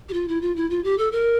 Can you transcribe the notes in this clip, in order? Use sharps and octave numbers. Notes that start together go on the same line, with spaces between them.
G4
F4
E4
F4
E4
F4
G4
A4
A#4